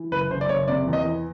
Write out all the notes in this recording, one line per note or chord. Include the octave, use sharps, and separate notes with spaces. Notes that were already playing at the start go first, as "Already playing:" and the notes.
Already playing: E3
F#1 B4
F#1 C5
D5
F#1 C#5
C3 D5
E2
D#5
E3